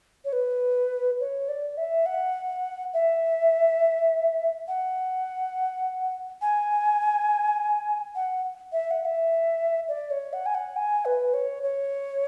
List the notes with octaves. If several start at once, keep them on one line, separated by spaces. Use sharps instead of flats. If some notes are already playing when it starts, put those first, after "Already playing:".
C#5
B4
C#5
D5
E5
F#5
E5
F#5
G#5
F#5
E5
F#5
F#5
E5
D5
C#5
F#5
G#5
F#5
G#5
B4
C#5
C#5